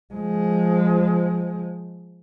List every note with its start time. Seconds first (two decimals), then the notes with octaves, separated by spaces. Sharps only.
0.14 F3 G#3